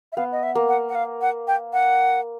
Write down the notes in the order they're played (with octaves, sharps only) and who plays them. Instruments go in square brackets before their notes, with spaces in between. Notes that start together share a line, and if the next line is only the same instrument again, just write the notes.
[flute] E5
[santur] B3 [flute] F5
[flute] D#5
E5
[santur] A#3
[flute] F#5
F#5
F5
F#5
G5
F#5